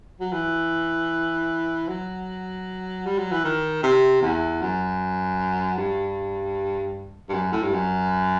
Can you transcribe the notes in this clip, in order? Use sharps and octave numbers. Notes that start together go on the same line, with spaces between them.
F#3
E3
F#3
G3
F#3
E3
D#3
C3
E2
F#2
G2
G2
F#2
A2
G2
F#2